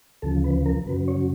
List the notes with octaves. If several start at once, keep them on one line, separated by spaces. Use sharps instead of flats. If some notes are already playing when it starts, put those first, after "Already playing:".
D2 C#3 F3 A4
B4
A#4
F#2 C#3 F#3 B4
C#5